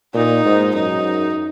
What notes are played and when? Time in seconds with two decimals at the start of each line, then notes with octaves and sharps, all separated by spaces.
0.15 A#2 D#4
0.45 G#2
0.75 F#2 D#4